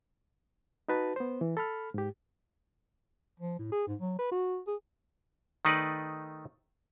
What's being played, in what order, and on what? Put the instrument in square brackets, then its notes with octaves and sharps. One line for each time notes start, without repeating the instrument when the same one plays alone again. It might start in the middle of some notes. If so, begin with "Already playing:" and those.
[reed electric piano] D#4 F#4 B4 A5
B3 C5
E3
A4 B5 F6
G#2 G4
[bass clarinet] F3
A2
G#4
G#2
F#3
B4
F#4
G#4
[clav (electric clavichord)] D#3 A3 D#4 B4 D5